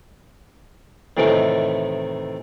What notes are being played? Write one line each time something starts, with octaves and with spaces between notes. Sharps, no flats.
A2 C3 D#3 E3 A3